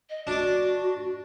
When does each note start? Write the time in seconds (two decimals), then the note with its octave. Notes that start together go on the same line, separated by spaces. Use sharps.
0.10 D#5
0.27 D4 F#4 D5